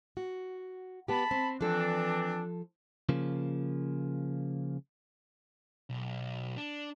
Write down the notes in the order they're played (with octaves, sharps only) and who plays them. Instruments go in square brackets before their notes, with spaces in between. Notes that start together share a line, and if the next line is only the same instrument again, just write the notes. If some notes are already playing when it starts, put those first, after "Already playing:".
[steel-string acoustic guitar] F#4
[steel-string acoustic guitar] B3 G4 [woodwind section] A5 B5
[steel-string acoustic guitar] C4
[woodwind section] E3 C4 D4 [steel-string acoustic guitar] F3 A4
[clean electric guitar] C#3 F3 A#3
[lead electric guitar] B1
D4